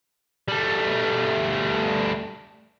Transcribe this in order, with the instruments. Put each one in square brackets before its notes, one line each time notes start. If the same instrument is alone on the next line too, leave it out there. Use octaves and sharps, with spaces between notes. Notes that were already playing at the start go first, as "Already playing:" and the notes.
[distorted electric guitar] G3 A3